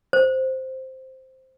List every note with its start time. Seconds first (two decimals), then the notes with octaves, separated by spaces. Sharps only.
0.13 C5